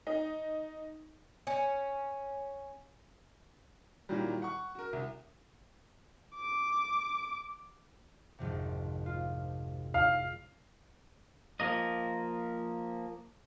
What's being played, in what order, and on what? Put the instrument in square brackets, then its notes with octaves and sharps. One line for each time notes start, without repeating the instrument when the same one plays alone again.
[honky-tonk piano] D#4
[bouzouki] C#4
[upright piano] A#2 D#3 E3 F#3 G3
F#5 C#6
F#4 A#4
C2
[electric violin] D6
[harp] G#1 F2 C3
F4
[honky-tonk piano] F5
[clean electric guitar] F3 A#3 D#5